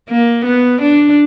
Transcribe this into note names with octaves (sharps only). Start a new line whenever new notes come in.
A#3
B3
D4